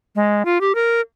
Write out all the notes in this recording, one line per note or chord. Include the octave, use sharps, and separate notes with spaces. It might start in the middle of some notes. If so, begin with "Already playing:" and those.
G#3
F4
G4
A#4